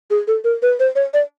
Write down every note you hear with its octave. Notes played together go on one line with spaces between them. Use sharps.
G#4
A4
A#4
B4
C5
C#5
D5